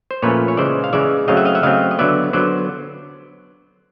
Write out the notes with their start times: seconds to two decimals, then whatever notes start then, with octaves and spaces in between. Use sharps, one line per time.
0.11 C5
0.22 A#2 F3 A3 C#4 B4 C#5
0.48 C#5
0.57 C#3 E3 G#3 C5 D5
0.84 F5
0.93 C#3 E3 G#3 D5 E5
1.28 C#3 F#3 A3 C4 D#5 F5
1.37 E5 F#5
1.45 D#5 F5
1.55 E5 F#5
1.63 C#3 F#3 A3 C4 D#5 F5
1.91 D#5
1.99 D3 F#3 B3 D5 E5
2.33 D3 F#3 B3 C5 D5